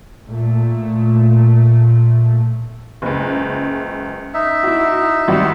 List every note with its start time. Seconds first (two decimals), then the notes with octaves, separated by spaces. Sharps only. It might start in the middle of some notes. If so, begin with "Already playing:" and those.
0.26 A#2 A3
3.02 F#1 C#2
4.34 D#4 E5
4.63 E4 F#4
5.28 G#1 G3 F#4